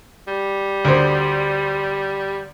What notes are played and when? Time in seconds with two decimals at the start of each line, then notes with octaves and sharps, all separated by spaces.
0.28 G3
0.85 D2 C5